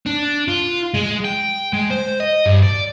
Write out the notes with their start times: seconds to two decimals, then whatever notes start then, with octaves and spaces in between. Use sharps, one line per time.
0.06 D4
0.48 F4
0.94 G#3
1.24 G5
1.73 G#3
1.90 C5
2.20 D#5
2.46 G2
2.63 D5